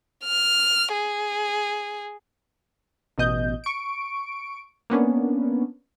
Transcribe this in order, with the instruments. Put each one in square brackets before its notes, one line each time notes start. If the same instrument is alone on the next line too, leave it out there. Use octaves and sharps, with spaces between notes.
[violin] F6
G#4
[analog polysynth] A1 B2 D#5 G6
C#6 D7
A#3 B3 C#4 D4